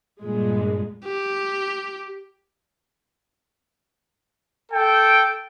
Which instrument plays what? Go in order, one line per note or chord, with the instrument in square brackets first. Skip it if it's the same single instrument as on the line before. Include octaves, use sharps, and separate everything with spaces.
[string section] G2 A#2 G#3
[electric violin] G4
[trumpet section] A4 G5